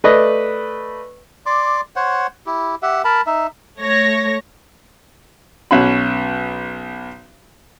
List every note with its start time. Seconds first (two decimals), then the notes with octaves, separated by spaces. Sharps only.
0.04 A3 B4 D5 D#5
1.46 D5 C6 D6
1.96 C5 C#5 F#5
2.46 E4 G4
2.82 G4 E5 F#5
3.04 A#4 A5 B5
3.27 D#4 E5
3.79 A3 C#5 A#6
5.71 B1 C#4 F#5 B5